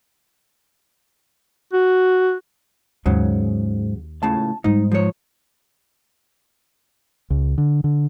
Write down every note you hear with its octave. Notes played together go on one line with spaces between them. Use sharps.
F#4
D#2 G#2 C#3 F#3
C#2 A2 C#3 A5
G#2 G3 B3 D#4
F3 C#5
C#2
D3
D3